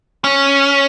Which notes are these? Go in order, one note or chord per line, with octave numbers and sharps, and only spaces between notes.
C#4